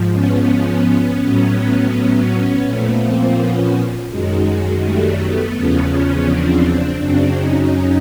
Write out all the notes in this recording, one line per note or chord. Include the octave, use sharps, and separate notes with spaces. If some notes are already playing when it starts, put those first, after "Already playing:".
Already playing: G#2 F3
B3 C#4
A2 F#3 B3 C#4
A#2 F3 A3 B3
A#3 C4
B3 C#4
F#2 D#3 F#3 G#3
G3 A3
A3 B3
E2 C#3 F3 B3 C#4
B3 C#4
C4 D4
F#2 C#3 F#3 C4 D4
C#4 D#4